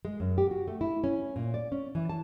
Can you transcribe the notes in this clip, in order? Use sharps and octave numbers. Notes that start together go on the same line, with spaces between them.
G#3
F#2
G4
F#4
A3
E4
C#4
A#2
D5
C#4
E3
A5